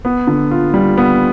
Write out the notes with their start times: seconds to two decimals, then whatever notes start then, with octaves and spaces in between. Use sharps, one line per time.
0.05 B3
0.27 D3
0.51 F4
0.74 G3
0.98 B3